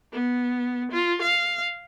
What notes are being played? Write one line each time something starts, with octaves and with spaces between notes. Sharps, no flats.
B3
F4
F5